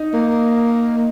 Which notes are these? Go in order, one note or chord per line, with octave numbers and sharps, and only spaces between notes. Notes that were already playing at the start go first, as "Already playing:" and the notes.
Already playing: D#4
A#3